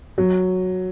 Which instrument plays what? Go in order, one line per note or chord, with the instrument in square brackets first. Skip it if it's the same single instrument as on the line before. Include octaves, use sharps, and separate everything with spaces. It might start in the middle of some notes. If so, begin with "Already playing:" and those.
[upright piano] F#3